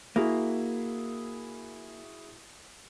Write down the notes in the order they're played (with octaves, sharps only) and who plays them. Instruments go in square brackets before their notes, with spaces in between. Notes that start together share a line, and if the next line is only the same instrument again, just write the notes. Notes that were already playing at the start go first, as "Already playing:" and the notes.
[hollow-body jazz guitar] A#3 [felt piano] E4 F#4 G#4